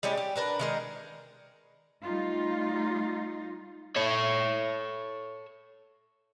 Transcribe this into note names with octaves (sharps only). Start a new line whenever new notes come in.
G3 G#3 C#4 G4
G4
D4 A#4 B4
D#3 G#3 A#4
G3 A3 D#4 F4
A4 C#5